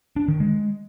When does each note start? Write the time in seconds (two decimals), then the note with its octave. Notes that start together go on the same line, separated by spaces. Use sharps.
0.16 D4
0.28 D#3
0.40 G#3